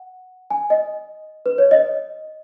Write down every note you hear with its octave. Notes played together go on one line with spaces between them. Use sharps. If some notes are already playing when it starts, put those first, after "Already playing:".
Already playing: F#5
G#5
D#5
B4
C#5
D#5